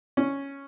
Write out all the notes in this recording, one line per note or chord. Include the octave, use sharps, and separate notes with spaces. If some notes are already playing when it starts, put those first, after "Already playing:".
C#4